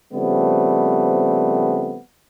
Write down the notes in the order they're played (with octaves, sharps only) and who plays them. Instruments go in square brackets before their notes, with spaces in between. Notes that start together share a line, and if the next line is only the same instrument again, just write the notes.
[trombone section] C#3 F3 G3 A3 B3 C4